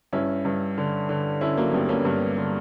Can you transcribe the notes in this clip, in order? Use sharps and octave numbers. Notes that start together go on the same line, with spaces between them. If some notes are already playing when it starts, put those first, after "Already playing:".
G2 C#4 E4
G2
D3
D3
D3 C#4 E4
F#3 A#3
G2 G3 B3
A#3 C#4
G2
D3